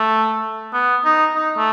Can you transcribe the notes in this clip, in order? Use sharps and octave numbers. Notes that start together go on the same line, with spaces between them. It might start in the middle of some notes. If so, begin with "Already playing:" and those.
Already playing: A3
B3
D#4
D#4
A3